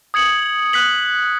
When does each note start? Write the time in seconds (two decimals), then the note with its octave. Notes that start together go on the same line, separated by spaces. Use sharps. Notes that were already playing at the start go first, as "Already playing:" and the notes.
0.14 D#6 G#6 C#7 F#7
0.73 F#6 B6 F#7